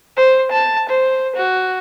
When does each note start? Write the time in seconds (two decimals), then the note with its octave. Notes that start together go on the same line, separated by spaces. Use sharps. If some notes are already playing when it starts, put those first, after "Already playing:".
0.15 C5
0.51 A5
0.88 C5
1.35 F#4